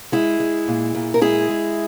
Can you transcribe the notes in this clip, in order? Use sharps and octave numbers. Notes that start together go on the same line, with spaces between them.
G#3 E4 G#4
G#3
A#2
A#2
A#4
G#3 E4 G#4
G#3